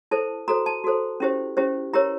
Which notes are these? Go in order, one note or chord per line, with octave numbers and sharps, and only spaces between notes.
E4 A4 C5 A5
F#4 A4 C5 A#5
A5
F#4 A4 C5
C#4 E4 G4 C5
C#4 E4 G4 C5
E4 G4 A#4 C#5 A#5